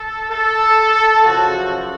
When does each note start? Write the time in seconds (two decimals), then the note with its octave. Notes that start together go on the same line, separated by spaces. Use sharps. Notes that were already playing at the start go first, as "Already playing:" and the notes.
Already playing: A4
0.31 A4
1.24 F#2 C#3 F3 F#4